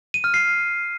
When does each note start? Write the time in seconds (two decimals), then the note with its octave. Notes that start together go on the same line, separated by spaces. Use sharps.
0.14 D#7
0.24 F6
0.34 C7